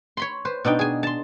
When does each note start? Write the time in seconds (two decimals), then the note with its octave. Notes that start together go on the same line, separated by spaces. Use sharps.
0.17 C#5 B5 C6
0.45 B4 C5
0.64 B2 D4 D#4 G5
0.79 G#4 G#5
1.03 A5 C6